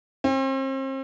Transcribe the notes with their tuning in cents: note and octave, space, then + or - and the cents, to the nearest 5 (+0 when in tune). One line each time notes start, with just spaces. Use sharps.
C4 +40